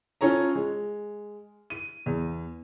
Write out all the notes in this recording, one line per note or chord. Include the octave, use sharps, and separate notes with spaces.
C#4 F4 A4 C#5 A#5
G#3
D#7
E2